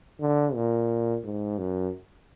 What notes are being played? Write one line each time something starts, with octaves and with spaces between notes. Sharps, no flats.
D3
A#2
G#2
F#2